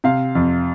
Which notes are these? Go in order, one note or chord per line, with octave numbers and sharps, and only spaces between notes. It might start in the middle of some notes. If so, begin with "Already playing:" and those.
C3 F5
F2